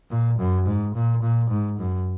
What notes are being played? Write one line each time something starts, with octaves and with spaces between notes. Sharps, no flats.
A#2
F#2
G#2
A#2
A#2
G#2
F#2